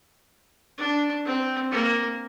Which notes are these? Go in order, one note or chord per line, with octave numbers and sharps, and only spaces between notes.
D4
C4
A#3